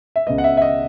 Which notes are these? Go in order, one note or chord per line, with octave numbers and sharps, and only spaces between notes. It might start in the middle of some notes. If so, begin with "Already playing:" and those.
E5
C#2 C#3 G#3 B3 D#5
F#5
E5
E5
D#5